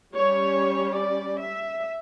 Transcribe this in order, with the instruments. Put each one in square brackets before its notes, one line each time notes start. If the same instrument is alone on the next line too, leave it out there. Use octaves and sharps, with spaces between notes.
[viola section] G3 C#4 C#5
D5
E5